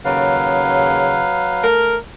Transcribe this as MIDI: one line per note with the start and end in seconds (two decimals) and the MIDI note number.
0.05 1.25 39
0.05 1.25 49
0.05 1.66 54
0.05 1.66 71
0.05 1.66 77
1.63 1.95 57
1.63 1.95 70